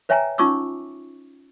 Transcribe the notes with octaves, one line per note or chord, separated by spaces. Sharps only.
B4 C#5 E5 G5 G#5 A#5
C#4 D#4 F4 C#6 D6 E6